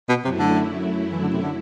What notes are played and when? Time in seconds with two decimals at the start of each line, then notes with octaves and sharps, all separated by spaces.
0.09 B2
0.24 F#2 C3 F#3 A3 E4
0.39 D3
1.12 E3
1.22 D3
1.33 C3
1.42 D3